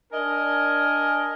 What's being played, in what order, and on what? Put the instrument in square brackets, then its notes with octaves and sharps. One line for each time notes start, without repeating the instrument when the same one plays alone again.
[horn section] D4 A#4 D#5 G#5